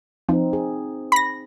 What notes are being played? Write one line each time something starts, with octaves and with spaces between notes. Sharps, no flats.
F3 C4 D#4
G#4
B5 A#6